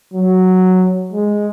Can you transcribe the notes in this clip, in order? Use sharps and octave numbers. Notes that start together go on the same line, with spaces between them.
F#3
G#3